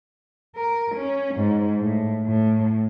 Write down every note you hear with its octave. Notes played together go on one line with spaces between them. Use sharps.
A#4
C#4
G#2
A2
A2